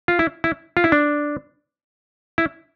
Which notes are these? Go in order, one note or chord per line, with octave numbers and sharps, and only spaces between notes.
F4
E4
E4
F4
E4
D4
E4